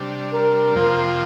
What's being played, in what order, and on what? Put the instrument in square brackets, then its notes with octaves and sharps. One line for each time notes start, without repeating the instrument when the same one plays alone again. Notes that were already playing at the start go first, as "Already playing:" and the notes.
Already playing: [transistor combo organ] C3 G3 D4
[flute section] A#4
[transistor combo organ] F2 C3 F3 A#3 F4